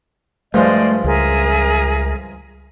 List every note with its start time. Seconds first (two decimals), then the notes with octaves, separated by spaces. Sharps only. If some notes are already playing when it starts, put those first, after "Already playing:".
0.54 G2 F3 G#3 A3 C5 D5 D#5
1.04 C#2 G#4 A#4 E5